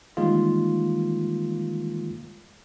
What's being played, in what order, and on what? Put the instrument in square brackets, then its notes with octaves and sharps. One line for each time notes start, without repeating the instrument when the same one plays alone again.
[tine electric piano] D#3 E3 G3 G#3 A#3 F4